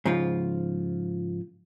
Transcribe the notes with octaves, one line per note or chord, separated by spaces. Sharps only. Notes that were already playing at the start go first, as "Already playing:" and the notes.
G#2 C#3 F3 F4